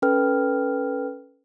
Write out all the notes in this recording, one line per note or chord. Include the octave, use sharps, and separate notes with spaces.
C#4 A4 B4 G5 F6